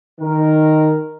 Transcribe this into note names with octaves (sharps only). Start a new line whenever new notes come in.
D#3 A#4